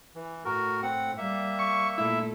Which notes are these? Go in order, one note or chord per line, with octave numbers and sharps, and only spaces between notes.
E3
A2 F#4 A#4
C4 F#5
G3 A#3 E5
C#6
A#2 A3 E4